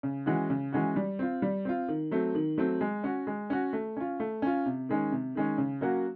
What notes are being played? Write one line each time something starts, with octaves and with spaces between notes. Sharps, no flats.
C#3
E3 G#3 C#4 F#4
C#3
E3 G#3 C#4 F#4
G3
C4 F4
G3
C4 F4
D#3
F#3 A3 C4
D#3
F#3 A3 C4
G#3
C#4 F#4
G#3
C#4 F#4
A3
C#4 F4
A3
C#4 F4
C3
D#3 G#3 C#4
C3
D#3 G#3 C#4
C#3
F#3 A#3 C#4 F#4